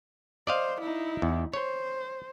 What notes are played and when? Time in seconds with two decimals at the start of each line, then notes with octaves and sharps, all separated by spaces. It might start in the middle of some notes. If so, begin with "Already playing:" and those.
0.47 C5 D5 D#5 F5
0.81 D#4 E4
1.22 E2
1.54 C5 C#5